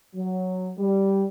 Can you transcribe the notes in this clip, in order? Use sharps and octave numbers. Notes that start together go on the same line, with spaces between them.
F#3
G3